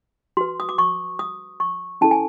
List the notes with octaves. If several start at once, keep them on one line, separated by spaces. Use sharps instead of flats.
F#4 B4 C6
D#6
D6
C#6
D#6
C#6
C#4 E4 A4 A5
G#5